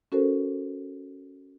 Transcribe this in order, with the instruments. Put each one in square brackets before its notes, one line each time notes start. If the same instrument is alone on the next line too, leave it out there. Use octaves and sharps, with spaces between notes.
[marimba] C#4 F#4 A4 A#4 C5